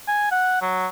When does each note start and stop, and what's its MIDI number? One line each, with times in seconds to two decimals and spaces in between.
0.08 0.31 80
0.31 0.61 78
0.62 0.87 54